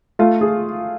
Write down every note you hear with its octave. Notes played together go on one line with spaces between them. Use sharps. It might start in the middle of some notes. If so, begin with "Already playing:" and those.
A3 F4
G#4